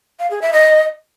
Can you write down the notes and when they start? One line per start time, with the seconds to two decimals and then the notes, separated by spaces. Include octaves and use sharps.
0.19 F5
0.31 G#4
0.42 E5
0.53 D#5